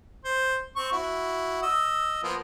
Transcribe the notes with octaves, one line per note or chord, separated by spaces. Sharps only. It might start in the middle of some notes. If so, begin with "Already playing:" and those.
C5
C4 C#6
E4 F#4
D#5 E6
F3 A#3 B3